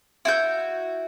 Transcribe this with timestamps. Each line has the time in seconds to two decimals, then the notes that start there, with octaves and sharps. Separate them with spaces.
0.25 E4 F#4 G6